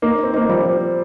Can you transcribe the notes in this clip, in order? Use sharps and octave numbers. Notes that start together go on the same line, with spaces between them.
A#3 D#4
C4 D#4
A#3 D#4
F3 G3
F3
F3